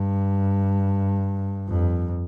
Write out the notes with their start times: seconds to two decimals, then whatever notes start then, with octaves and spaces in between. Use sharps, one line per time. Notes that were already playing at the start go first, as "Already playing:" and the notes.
Already playing: G2
1.68 F2